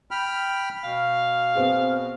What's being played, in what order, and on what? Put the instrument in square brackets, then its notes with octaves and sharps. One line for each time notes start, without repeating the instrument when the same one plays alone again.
[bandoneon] G5 B5 F6
[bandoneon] B2 [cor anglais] F5
[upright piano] B3 C4 G#4